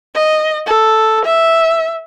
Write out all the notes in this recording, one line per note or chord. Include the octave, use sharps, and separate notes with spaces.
D#5
A4
E5